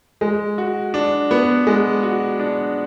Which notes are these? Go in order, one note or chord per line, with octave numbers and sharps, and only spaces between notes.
G#3
F#4
D4
B3
G#3
F#4
D4